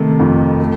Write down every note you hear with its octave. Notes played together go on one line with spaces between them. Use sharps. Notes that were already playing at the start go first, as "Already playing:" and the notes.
Already playing: C3 D#3 A3
F2
A3